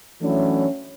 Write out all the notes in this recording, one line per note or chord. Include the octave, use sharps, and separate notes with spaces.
E3 F#3 A3 C#4 D4 E4